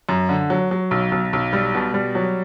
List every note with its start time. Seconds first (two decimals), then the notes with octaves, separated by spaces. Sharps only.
0.09 F#2
0.29 D3
0.50 F#3
0.71 F#3
0.91 B1
1.12 B1
1.33 B1
1.53 G3
1.75 B2
1.94 G3
2.15 F#3